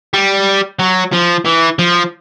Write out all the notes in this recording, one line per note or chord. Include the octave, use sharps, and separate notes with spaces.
G3
F#3
F3
E3
F3